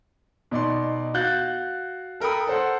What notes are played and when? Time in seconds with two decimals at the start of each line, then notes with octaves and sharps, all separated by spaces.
0.51 B2 D#4 D5 C6
1.14 F#4 F5 F#6 G6 A6
2.20 A4 A#4 G5 B5 D#6
2.47 A4 C5 F#5